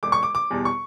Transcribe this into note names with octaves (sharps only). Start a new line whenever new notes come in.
E1 D6
C#6
D6
D6
E2 B2 G3
C#6